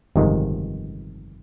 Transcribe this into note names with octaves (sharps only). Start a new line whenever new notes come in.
G1 F2 C3 D#3 G#3